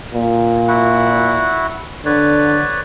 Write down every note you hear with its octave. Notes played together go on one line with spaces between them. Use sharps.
A#2
E4 F#4 F#5
D3 B4 C#5 D5